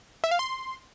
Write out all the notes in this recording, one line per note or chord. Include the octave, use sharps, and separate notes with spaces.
E5
F5
C6